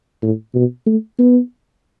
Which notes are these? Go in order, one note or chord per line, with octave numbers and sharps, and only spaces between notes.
A2
B2
A3
B3